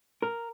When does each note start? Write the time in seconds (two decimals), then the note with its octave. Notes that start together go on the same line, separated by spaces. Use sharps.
0.22 A#4